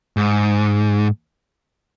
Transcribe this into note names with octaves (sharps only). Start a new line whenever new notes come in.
G#2